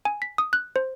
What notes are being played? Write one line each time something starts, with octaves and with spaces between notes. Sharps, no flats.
G#5
B6
D#6
F#6
C5